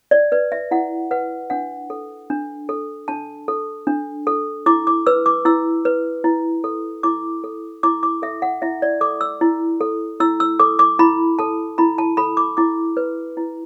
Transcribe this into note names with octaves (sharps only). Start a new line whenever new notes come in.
D5
B4 D5
E5
E4 F#5
B4 F#5
D4 F#5
A4
D4
A4
D4 A5
A4
D4
A4
E4 D6
D6
B4 E6
D6
E4 E6
B4
E4
A4
E4 D6
A4
E4 D6
D6
A4 E5
F#5
E4 E5
D5
A4 D6
E6
E4
A4
E4 E6
E6
A4 D6
D6
E4 B5
A4 A5
E4 B5
A5
A4 B5
D6
E4 D6
B4
E4